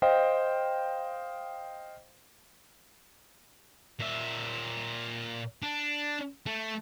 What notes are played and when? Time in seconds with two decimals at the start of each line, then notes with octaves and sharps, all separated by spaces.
0.02 C5 D#5 F5 G5
4.00 A#2 E5
5.62 D4
6.46 A3